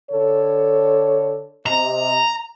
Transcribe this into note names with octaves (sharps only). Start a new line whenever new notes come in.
D3 A4 C#5
C3 D#5 A#5